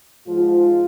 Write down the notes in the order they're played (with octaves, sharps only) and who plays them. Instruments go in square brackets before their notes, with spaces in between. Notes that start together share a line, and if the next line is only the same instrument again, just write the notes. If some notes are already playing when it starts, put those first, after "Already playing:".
[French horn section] G#2 F3 G#3 F4